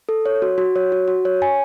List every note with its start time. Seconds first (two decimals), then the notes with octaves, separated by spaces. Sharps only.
0.09 A4
0.26 C#5
0.42 F#4
0.58 F#4
0.76 C#5
0.92 F#4
1.08 F#4
1.25 C#5
1.42 G#5